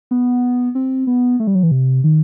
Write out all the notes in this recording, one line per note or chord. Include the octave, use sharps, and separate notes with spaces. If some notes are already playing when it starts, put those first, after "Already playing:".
B3
C4
B3
A3
G3
F#3
E3
C3
D#3